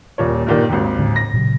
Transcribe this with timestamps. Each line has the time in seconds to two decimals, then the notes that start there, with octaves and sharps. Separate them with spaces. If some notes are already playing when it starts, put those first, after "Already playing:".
0.18 D#1 A#2 C#5
0.47 G2 A#2 D#3
0.69 G#1 D#2
0.99 A2 D3 C#4
1.16 A#6
1.33 A#2 C#3 F#3